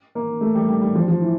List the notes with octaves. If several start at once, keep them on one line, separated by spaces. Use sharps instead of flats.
A#3
A3
G3
G3
G3
F3
F3
E3